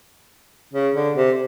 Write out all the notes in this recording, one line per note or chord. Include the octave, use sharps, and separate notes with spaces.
C#3
D3
C3